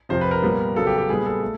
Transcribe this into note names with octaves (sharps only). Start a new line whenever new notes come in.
F2 C3 F3 C5
B4
A#4
A#2 G3 B3
C#3 F#3 B3 A4
G4
G4
A#2 G3 B3 G#4
A4
A3